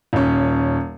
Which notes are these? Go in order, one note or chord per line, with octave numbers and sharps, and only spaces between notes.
D#1 C#4